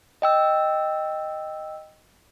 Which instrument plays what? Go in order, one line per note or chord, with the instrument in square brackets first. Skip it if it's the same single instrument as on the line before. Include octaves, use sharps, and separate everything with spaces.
[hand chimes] D#5 G5 E6